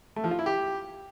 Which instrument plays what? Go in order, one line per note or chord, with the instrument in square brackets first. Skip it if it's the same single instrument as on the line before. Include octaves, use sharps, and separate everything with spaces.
[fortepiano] A3
F3
F4
E4
G4